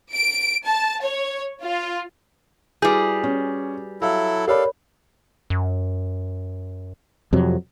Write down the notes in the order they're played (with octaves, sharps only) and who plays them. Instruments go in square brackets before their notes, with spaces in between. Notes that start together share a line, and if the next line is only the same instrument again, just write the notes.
[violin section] D7
A5
C#5
F4
[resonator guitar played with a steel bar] G3 G#4 [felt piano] E4 [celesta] F#4 B4 G6
[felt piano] C#4
[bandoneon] F#3 E4 A4 [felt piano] E5 F5
[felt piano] G4 D5 [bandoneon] A4 F5 [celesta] A#4 C#5 B5
[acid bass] F#2
[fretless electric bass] F2 C3 F#3